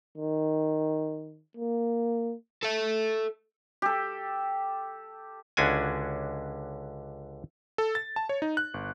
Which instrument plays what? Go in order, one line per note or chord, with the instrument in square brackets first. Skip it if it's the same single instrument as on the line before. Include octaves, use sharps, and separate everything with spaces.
[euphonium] D#3
A#3
[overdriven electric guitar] A4 E5
[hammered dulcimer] G4 A4
[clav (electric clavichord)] C#2 D3 C#4 D4 F#4 G#5
[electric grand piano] A4
A6
A5
C#5
D#4
F#6
G1